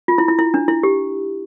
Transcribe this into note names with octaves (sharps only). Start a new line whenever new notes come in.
F4
E4
E4
E4
D4
E4
G4